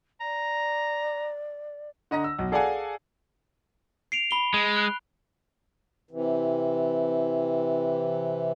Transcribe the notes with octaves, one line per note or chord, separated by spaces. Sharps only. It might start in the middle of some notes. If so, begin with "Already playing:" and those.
D5 A#5
D3 D#5 A#5 A#6
E6
B1
G#4 A4 D5 F5 F#5 G#5
C7 D7 F7
B5 G7
G#3
F#6
C3 E3